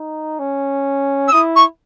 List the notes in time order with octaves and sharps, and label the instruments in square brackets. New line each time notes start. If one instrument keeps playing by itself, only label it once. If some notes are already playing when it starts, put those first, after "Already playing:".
Already playing: [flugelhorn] D#4
C#4
[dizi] E6
[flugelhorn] E4 [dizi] D#6
[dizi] C#6